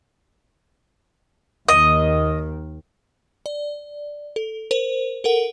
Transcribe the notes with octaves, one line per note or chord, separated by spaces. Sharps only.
D#2 D#3 D#5
D5
A4
A#4 C5
A4 A#4 F#5